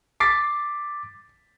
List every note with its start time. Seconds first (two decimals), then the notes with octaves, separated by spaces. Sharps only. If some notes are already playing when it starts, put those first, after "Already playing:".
0.20 D6 A6 B6 C7